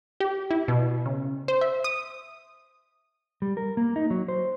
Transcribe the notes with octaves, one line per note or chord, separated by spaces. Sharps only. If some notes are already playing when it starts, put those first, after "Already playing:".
G4
E4
B2
C#3
C5
E5
D#6
G3
A#4
A#3
D#4
F#3
C5